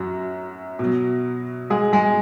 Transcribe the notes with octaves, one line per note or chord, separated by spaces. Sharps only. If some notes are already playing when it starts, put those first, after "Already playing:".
Already playing: F#2 F#4
B2
F#3
G#3 G#4
G#3 G#4